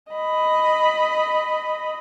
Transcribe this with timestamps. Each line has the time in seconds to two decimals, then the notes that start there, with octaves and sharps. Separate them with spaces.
0.13 D#5 B5